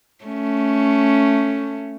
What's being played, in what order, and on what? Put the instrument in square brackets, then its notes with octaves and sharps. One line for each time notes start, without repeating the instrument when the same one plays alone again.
[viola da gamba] A3 C#4